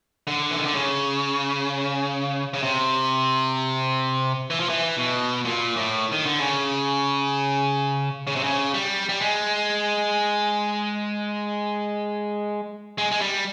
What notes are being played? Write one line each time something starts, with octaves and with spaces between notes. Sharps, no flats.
D3
E3
D#3
D3
C#3
C#3
C3
E3
F3
E3
B2
A#2
A2
D#3
D3
C#3
C#3
C3
C#3
G3
G3
G#3
G#3
G#3
G3